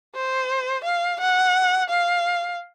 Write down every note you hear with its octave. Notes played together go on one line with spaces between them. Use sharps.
C5
F5
F#5
F5